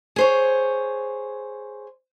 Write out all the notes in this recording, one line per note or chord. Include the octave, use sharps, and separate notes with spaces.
G#4 C5 C#5